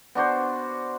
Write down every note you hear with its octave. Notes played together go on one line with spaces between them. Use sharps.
B3 D4 F#4 C5